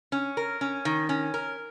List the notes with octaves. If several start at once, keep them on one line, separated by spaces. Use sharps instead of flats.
C#4
A#4
C#4
D#3
C#4
A#4